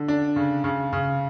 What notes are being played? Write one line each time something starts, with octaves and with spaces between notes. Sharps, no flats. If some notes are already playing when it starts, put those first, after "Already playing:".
Already playing: D3
D4
C#3
C#3
C#3